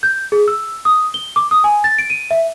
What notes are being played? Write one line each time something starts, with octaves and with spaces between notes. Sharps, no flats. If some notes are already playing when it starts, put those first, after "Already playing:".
G6
G#4
E6
D#6
G7
D6
D#6
G#5
A6
D7
D#7
E5